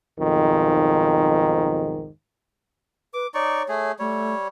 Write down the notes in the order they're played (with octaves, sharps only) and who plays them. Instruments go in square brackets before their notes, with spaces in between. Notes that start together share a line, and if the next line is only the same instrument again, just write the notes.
[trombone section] B1 F2 G#2 D#3
[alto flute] B4 [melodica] D6
[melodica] D#4 D5 C#6 [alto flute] C#5
[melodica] A3 G#4
[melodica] G3 C#5 [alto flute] A3